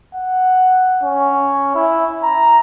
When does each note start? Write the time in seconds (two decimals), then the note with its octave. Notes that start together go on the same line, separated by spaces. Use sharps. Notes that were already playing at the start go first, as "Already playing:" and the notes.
0.15 F#5
1.03 C#4
1.75 E4
2.23 A#5